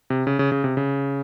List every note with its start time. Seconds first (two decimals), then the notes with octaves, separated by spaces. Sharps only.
0.10 C3
0.27 C#3
0.39 C#3
0.52 C#3
0.64 C3
0.77 C#3